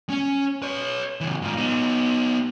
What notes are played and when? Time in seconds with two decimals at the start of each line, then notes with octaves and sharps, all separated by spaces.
0.10 C#4
0.62 B4 C#5
1.21 C#3 E3
1.42 G#2 F4
1.57 B3 D#4